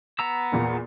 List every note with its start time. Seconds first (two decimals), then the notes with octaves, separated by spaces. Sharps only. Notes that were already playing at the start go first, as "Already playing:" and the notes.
0.19 B3 A#5 E6
0.52 E2 A#2 A#3